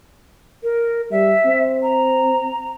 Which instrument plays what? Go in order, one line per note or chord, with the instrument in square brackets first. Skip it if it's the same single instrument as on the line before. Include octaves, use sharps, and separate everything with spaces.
[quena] A#4
[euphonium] G3 [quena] E5
[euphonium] C4
[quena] A#5